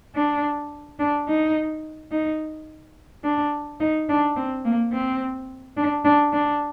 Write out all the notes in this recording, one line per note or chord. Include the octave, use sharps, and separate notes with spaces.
D4
D4
D#4
D#4
D4
D#4
D4
C4
A#3
C4
D4
D4
D4